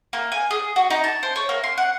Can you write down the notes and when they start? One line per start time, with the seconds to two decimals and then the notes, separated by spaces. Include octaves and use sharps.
0.13 A#3
0.32 G#5
0.51 G#4
0.76 F#4
0.90 D#4
1.04 A5
1.23 C5
1.36 C#5
1.49 A#3
1.64 C6
1.78 F#5